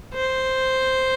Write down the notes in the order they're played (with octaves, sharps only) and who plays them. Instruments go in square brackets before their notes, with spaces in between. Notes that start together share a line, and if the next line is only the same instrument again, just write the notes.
[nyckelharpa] C5